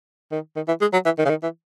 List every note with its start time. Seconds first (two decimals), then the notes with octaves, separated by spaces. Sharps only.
0.32 D#3
0.56 D#3
0.68 E3
0.81 G#3
0.93 F#3
1.06 E3
1.18 D#3
1.25 C#3
1.30 D#3
1.43 E3